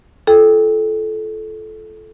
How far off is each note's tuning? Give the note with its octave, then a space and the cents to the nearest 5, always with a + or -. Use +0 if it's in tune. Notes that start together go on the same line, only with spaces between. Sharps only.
F4 -25 A4 -20 G5 +10